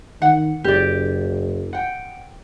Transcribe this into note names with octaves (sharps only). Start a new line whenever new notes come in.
D#3 F#5
F#1 G4 D5
F#5 G5